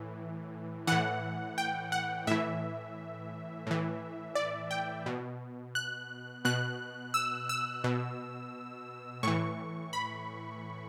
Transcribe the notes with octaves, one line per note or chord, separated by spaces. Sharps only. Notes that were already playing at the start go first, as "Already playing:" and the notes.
Already playing: A2 E3
A2 E3 F#5
G5
F#5
A2 E3 E5
A2 E3
D5
G5
B2
F#6
B2 F#6
E6
E6
B2
A2 E3 C#6
B5